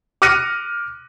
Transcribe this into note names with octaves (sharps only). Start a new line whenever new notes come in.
D6 F6 F#6 A#6 C#7 D#7